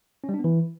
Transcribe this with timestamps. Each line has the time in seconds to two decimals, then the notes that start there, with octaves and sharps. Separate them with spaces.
0.24 C#4
0.29 G3
0.34 D4
0.39 B3
0.44 E3